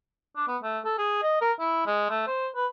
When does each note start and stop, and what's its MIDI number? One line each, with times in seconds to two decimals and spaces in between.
0.36 0.46 62
0.48 0.57 59
0.63 0.80 57
0.85 0.97 69
0.98 1.20 68
1.23 1.37 75
1.41 1.52 70
1.59 1.83 64
1.87 2.07 56
2.10 2.24 57
2.27 2.48 72
2.55 2.66 71